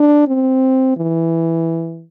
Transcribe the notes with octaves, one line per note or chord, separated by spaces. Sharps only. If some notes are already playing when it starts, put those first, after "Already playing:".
Already playing: D4
C4
E3